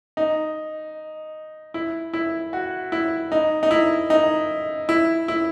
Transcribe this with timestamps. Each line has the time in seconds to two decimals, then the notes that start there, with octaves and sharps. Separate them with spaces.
0.17 D#4
1.74 E4
2.13 E4
2.53 F#4
2.92 E4
3.32 D#4
3.63 D#4
3.71 E4
4.10 D#4
4.89 E4
5.28 E4